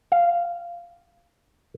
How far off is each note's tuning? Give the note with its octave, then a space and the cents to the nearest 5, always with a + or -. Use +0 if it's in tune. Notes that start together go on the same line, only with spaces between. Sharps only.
F5 -10